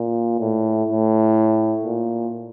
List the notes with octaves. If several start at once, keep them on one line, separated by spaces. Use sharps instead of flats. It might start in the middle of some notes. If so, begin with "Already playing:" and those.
Already playing: A#2
A2
A2
A#2